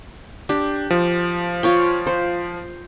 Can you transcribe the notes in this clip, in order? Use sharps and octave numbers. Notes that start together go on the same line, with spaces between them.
D4 G4
F3
F4 C#5 G5
C5